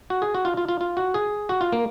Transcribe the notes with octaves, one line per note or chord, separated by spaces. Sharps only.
F#4
G#4
F#4
F4
F4
F4
F4
F#4
G#4
F#4
F4
A#3